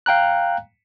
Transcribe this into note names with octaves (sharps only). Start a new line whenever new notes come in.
F5 G5 A#5 F#6